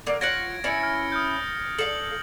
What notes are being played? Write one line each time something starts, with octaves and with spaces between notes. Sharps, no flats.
D3 A#3
F4 C#5 F#5 G#6 A#6 D7
C#4 E4 B4 A6 C#7
F6
D#6 F6 G6
A4 F5 F#7